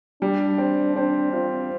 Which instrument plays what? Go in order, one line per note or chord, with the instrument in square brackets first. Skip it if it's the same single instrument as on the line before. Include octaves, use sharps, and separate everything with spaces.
[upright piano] G3 [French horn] D4
[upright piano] C4
[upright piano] C4 [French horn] D4
[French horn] C4 [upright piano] F4